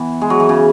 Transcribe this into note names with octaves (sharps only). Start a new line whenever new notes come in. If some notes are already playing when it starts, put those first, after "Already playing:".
Already playing: E3 B3
G#3
F#3
E3
C#3